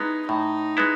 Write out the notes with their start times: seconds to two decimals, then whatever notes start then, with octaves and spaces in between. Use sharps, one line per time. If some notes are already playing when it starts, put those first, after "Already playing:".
Already playing: G#3 B3 D#4 E4
0.29 A2 D#4
0.77 G#3 B3 E4